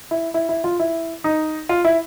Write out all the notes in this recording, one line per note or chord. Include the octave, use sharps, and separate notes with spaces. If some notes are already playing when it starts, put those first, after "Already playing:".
E4
E4
E4
F4
E4
D#4
F4
E4